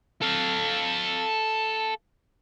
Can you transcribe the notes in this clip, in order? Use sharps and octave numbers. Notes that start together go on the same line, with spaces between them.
A4 F5